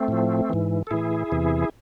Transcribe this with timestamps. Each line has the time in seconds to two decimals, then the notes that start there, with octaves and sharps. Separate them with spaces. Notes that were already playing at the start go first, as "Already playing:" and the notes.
Already playing: A3 C4
0.08 A2 F3
0.50 G#2 E3
0.87 A4
0.91 A2 E3 E4 G#4
1.32 E2 C3 E3